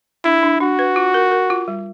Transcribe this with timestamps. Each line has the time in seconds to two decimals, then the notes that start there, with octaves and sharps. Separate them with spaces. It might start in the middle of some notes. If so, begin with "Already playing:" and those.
0.24 D4 E4
0.43 D4
0.60 D4 F#4
0.79 B4
0.96 F4
1.14 A#4
1.31 A#4
1.50 F4
1.68 G3